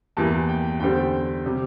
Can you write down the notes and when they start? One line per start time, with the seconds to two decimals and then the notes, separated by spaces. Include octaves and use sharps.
0.17 E2 E3 G3 A#3 A5
0.49 G5
0.80 E2 D3 G3 C4 G5
1.46 C3 G3